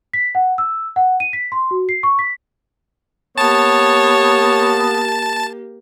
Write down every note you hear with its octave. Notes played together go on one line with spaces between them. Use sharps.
B6
F#5
E6
F#5
D#7
B6
C6
F#4
C7
C#6
B6
A#3 B3 G4 C#5 A5